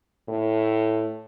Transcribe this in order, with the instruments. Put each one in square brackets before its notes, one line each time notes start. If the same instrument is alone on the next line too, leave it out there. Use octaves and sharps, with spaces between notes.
[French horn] A2